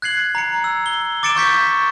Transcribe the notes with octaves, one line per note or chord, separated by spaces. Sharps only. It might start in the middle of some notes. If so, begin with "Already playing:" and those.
F#6 G#6 C7 F#7
A#5 C#7
E6
G7
D6 A6 C#7 D7 E7
C#6 G6 B6 C#7